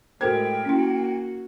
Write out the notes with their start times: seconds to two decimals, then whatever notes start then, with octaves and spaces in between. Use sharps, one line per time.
0.21 A2 G#3 F#4 A4 A#4 C5 G5 G#6
0.65 A#3 C#4 E4 F#4